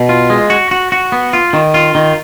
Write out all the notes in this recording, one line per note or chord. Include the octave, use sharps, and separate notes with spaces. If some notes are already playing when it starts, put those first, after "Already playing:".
Already playing: B2
F4
G#3
F#4
F#4
F#4
B3
F4
D#3
F4
D#3